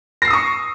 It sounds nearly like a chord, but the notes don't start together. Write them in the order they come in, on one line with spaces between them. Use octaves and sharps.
A#6 C7 E6 D#6 C#6